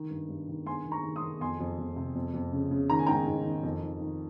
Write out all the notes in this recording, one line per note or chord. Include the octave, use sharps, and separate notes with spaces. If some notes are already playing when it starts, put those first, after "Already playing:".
Already playing: D#3
G2
G2
D#3
G2 G#5 C6
D#3
A#5 C#6
D#3
C6 D#6
D#3
F2 G#5 C6
F2
F2
C3
F2
F2
C#3
C#3
D#3 A#5
G#5
G#2 G5 A#5
G#2
D#3
F2
D#3
D#3